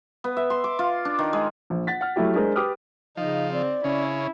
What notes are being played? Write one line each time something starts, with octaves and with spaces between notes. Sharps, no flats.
B3
E5
C6
D6
F4
D4
D#3
G#3
A#1
F#5 A6 B6
F#5 F6
F#3 A3 E4 G4
G#3 D4 G#4 A#4 C5
G4 B4 D6 D#6 F6
C#3 F3 D#4
C4 D5
C#3 C#4 E4